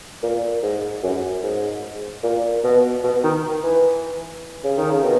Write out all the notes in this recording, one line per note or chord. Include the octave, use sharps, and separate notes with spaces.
A#2
G#2
F#2
G#2
A#2
B2
B2
D#3
E3
C#3
D#3
C#3
B2